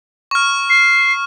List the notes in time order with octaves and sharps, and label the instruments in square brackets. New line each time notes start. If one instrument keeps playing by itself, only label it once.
[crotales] C#6 F6
[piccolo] C7